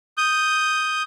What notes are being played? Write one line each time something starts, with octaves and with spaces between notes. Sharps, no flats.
D#6 G6